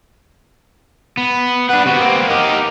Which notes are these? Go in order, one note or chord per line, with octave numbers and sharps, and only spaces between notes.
B3
D4 B4 F#5
C3 B3 F#4
A#3 C4
D#4 G4 A#4